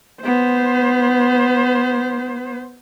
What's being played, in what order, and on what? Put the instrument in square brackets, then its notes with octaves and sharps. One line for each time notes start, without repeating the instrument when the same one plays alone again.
[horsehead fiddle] B3 C5